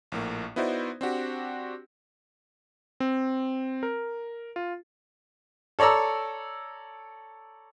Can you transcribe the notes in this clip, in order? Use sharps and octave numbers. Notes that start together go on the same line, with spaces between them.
A#1 A2 A#3
B3 D#4 E4 F#4 C5 D5
C4 D4 F#4 G4
C4
A#4
F4
A4 C#5 D5 A#5 E6